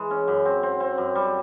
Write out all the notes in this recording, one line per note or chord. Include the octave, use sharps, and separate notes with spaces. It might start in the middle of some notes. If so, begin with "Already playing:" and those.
Already playing: E3 G#3
C#4
F#2
C4
C4
C4
F#2
G3